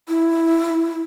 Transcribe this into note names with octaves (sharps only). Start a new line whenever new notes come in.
E4